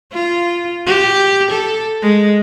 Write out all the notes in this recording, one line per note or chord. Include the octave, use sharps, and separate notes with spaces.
F4
G4
A4
G#3